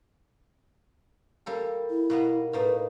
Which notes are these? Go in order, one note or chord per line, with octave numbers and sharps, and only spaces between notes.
G3 A#3 A4
E4
B2 A#3 B3
A2 A#3 D#4 B4